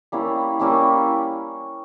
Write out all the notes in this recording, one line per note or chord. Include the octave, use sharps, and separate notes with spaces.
G3 A#3 C#4 E4
G3 A#3 C#4 E4